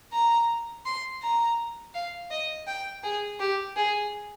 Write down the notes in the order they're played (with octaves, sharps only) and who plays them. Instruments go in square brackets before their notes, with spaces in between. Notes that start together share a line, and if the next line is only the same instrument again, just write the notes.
[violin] A#5
C6
A#5
F5
D#5
G5
G#4
G4
G#4